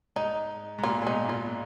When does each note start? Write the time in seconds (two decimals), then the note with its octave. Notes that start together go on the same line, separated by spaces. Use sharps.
0.16 G#2 D#4
0.78 G#2
0.83 A#2 F4
1.02 A#2
1.06 G#2 B2 D#4
1.29 A#2 F4